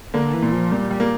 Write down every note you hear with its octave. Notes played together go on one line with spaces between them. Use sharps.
D3 A#3
E3
A#2
F3
A#2 G3
G3
A#3